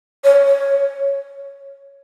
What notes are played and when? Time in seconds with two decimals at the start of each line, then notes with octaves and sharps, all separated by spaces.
0.24 C#5
0.45 C#5